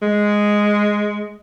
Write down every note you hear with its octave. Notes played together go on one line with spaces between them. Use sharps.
G#3